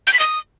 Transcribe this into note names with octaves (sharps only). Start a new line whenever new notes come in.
G6
B6
D#6